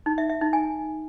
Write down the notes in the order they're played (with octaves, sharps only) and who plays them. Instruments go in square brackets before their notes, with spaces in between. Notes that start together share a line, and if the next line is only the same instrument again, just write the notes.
[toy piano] D#4
E5
E5
D#4
G#5